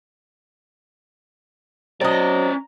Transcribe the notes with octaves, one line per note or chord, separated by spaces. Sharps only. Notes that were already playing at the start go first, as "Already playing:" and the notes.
F#3 C4 C#4 D5 D#5 A#5